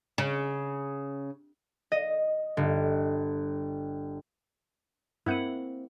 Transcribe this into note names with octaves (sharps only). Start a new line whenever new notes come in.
C#3
D#5
G1
G2 A#3 C4 E4 F#5 G6 D#7